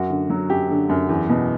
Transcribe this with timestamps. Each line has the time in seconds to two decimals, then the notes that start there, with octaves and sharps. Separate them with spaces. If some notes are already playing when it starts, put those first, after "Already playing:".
Already playing: F#2 F#4
0.10 D3
0.30 F#3
0.50 F#2 G4
0.70 D3
0.89 F#2
1.09 E2
1.29 B2